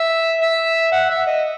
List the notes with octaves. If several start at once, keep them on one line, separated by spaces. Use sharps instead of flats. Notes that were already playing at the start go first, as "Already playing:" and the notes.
Already playing: E5
E5
F#5
E5
D#5